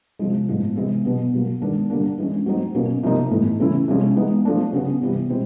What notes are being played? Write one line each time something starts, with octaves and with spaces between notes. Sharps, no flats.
C3 F3 G#3
A2 F3 G#3 B3
C3 E3 G#3 B3 E4
B2 F#3 B3
B2 F#3 A#3
D#3 G#3 B3 D4
D3 G3 A#3 D4
E3 G#3 C#4
F#3 A3 C4 D#4
B2 F#3 A#3 C#4
C3 F3 A#3 D#4
A2 E3 A3
C#3 E3 A3 C#4 E4
C3 F3 G#3 C#4
E3 G#3 B3 D#4
F3 A3 D4
C#3 F#3 B3
C3 E3 G3 B3 E4
B2 G#3 C4 E4